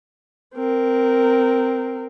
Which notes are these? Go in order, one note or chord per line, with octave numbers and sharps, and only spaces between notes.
C4 A#4